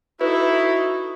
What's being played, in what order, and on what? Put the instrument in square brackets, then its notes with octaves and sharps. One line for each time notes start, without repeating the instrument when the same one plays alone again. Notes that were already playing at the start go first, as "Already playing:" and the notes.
[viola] D#4 A4 [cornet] E4 [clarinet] F#4 [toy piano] B4